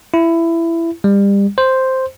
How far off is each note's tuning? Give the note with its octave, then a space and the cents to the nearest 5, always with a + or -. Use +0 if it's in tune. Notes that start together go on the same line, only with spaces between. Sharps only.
E4 +15
G3 +30
C5 +0